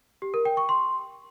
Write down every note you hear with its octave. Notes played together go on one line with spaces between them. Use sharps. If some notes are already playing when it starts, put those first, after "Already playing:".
G4
A#4
G5
C#6
C6